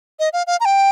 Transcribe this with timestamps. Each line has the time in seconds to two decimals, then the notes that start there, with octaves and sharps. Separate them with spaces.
0.19 D#5
0.33 F5
0.47 F5
0.60 A#5
0.65 G5